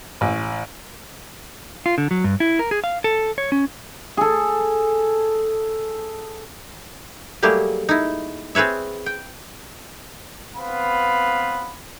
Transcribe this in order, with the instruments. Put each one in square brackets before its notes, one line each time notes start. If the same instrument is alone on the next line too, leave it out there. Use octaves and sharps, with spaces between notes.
[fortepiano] A1
[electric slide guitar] F4
D3
F#3
G2
E4
A#4
G#4
F5
A4
C#5
C#4
[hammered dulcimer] G#4 A4
[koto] F#3 G3 A3 A#3 G4 G#4
D#4 E4
C4 G#4 B4 C#5 E5
G5
[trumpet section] B3 C4 B4 F5 B5